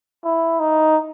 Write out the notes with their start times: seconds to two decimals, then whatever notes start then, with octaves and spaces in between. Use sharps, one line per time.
0.25 E4
0.60 D#4